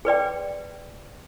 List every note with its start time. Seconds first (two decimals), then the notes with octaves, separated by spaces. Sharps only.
0.05 G#4 B4 D5 G5